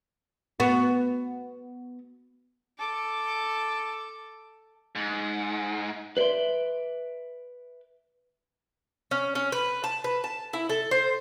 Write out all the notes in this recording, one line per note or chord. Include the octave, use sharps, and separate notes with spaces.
B3 F#4
A4 D6
G#2
B4 C5 D5 E5 C6
C#4
C#4
B4
A5
B4
A5
E4
A4
C5